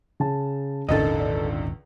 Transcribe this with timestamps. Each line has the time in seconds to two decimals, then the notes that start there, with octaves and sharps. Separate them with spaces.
0.20 C#3 A5
0.89 D#1 G#1 C#2 D3 D#3 A4 D#5
1.20 D5